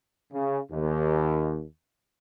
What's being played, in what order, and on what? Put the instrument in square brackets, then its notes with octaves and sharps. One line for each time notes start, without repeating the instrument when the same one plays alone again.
[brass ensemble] C#3
D#2